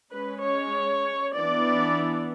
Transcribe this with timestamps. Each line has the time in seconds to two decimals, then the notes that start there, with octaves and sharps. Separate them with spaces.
0.12 G#3 C#4 B4
0.43 C#5
1.35 E3 B3 D4 D5